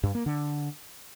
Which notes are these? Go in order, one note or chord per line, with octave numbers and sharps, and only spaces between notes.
G2
A#3
D3